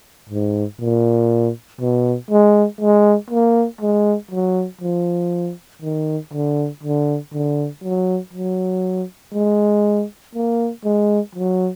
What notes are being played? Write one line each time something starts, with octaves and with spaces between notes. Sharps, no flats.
G#2
A#2
B2
G#3
G#3
A#3
G#3
F#3
F3
D#3
D3
D3
D3
F#3
F#3
G#3
A#3
G#3
F#3